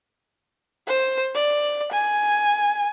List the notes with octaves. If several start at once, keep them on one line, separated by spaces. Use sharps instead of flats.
C5
D5
G#5